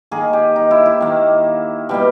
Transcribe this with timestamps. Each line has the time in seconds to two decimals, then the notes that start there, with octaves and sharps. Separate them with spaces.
0.11 D#3 A#3 G#4
0.33 G4
0.56 D#4
0.71 E4
0.86 E4
1.01 D#3 A#3
1.89 B2 G3 A#3 G4